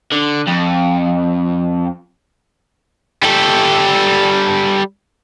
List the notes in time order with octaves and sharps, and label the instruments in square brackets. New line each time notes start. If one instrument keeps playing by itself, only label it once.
[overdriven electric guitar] D3
F2
G3 A4